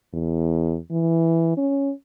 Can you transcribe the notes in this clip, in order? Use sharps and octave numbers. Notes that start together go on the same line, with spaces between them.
E2
E3
C#4